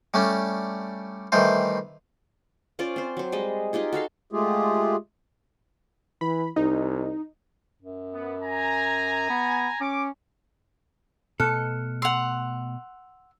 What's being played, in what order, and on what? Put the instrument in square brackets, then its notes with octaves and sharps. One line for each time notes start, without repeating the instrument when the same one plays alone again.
[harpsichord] G3 A3 C#4 D4
D#3 E3 G3 A3 C5
[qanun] C#4 F4 C5 D5
C4 C5
F#3 C5
G3 G#3 D#5
D#4 F4 G4 G#4
F#4 A4 F5 C6
[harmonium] G#3 A3 F4 G4 G#4
[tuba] E3 [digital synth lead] B5
[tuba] C2 [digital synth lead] D#4
[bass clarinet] F#2
[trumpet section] B3
G#5 A#5
[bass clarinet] B3
[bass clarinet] C#4 [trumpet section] D6
[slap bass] B2 A3 [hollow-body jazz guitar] A4 [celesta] F6 F#6 C#7
[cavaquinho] F#5 C6 [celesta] E6 F7